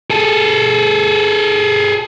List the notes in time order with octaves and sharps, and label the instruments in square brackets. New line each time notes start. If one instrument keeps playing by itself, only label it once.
[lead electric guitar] G#4 A4